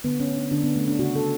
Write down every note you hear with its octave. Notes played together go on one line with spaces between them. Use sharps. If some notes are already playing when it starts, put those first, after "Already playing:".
D3 B3
C#4
A3
D4
D3 D4
B3
A3 C#4
D4
C#3 F#4
A4